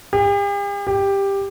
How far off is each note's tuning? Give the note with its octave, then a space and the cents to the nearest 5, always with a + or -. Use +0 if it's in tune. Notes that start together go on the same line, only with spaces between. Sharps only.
G4 +45
G4 +10